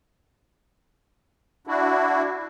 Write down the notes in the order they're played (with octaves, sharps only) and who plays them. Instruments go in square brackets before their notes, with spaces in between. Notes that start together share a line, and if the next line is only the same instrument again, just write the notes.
[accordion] D4 E4 F#4